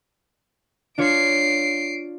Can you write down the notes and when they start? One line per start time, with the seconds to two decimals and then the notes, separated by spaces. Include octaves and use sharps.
0.98 D4 F4 C#5 C7 D7